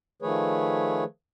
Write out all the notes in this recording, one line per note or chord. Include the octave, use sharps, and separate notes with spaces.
D#3 F3 A3 G#4 B4 C#5